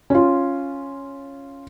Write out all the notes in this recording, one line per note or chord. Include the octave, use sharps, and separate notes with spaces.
C#4 F4